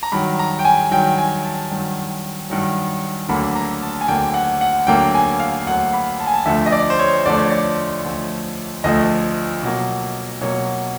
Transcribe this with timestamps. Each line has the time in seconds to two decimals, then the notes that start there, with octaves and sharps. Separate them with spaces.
0.03 A#5
0.12 G2 D#3 F#3 B5
0.39 A#5
0.59 G5
0.65 G#5
0.91 G2 D#3 F#3 G5
1.18 G#5
1.45 A5
1.71 G2 D#3 F#3
2.50 G2 D#3 F#3
3.29 D2 D3 F#3 A#3 B5
3.56 A#5
3.82 A5
4.01 G#5
4.08 D2 D3 F#3 A#3 G5
4.34 F#5
4.61 F#5
4.87 D2 D3 F#3 A#3 G5
5.14 G#5
5.40 F5
5.66 D2 D3 F#3 A#3 F#5
5.93 B5
6.20 A5
6.27 G#5
6.34 A5
6.46 D2 D3 F3 A3 E5
6.66 D#5
6.72 D5
6.90 C5
6.99 C#5
7.25 D2 D3 F3 A3 D5
7.38 C#5
7.50 D5
8.04 D2 D3 F3 A3
8.84 D2 D3 F3 A3 D#5
9.63 B2 F#3 A#3
10.41 B2 F#3 A#3 C#5